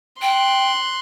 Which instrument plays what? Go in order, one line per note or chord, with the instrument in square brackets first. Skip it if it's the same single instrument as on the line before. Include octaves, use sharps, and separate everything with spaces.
[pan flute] G5 [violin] C6 F#6